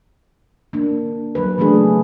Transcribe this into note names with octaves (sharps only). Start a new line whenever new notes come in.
A#3 D4
F#3 G#3 B4
C#3 E3 A3 B3 D4 G#4